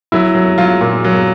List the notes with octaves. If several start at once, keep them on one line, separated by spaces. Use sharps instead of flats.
F#3 E4
F#3
F#3 F4
A#2
F#3